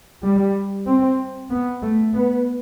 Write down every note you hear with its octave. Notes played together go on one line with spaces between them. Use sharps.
G3
C4
B3
A3
B3